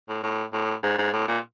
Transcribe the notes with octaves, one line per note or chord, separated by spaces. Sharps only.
A2
A2
A2
G#2
G#2
A2
A#2